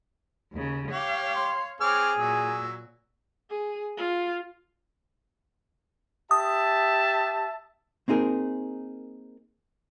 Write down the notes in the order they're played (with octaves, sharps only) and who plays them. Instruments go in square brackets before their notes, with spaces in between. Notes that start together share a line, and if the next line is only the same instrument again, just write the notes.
[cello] D#2 C#3
[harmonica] G4 [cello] C#5 F5
[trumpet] C6
[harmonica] C4 D6 F6 [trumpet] G#4 [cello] C#5
[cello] A#2 [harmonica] F#3 E6
[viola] G#4
F4
[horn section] G4 E5 A5 [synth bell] D#6
[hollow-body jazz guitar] A#3 C4 D#4 G#4 A#4